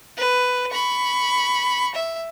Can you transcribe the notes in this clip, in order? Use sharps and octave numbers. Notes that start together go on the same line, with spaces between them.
B4
B5 C#6
E5